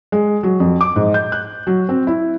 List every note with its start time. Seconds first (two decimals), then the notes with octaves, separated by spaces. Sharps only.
0.12 G#3
0.43 F#3
0.60 F2
0.81 D6
0.96 G#2
1.14 G6
1.32 F#6
1.67 F#3
1.89 C4
2.07 E4